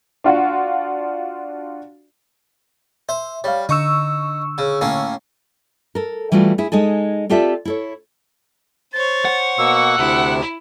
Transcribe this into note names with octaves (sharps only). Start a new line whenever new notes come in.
D4 F4 F#4
C5 E5
G3 C#5 F5
D3 D#4 C#6 E6
C#3
A2 A#3 C#4
A4 A#4
E3 G3 A3 F4 F#4
E4 G#4
G#3 D#4 G#4 A4
C4 F4 G4 A4 D5 E5
E4 A4 C#5
C5 C#5 A6
F#5
B2 A#3 C#6 E6
D2 C3 E4